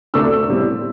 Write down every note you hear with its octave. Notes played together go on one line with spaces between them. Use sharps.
D2 C3 A3 D4 E6
A2 G3 C4